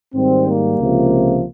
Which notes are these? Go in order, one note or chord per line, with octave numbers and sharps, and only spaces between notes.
G#2 D#3 G3 C4
A#3
C#2 C3 F3